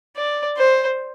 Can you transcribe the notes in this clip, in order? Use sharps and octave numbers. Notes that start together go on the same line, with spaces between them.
D5
C5